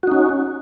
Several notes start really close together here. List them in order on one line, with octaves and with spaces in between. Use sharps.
F#4 D#4 C#4